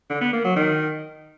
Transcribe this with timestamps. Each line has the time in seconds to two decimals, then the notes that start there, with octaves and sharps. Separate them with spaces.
0.10 D3
0.21 B3
0.33 A#3
0.44 F#3
0.56 D#3